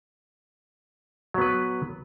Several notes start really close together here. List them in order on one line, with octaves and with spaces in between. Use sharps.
F#3 B3 B4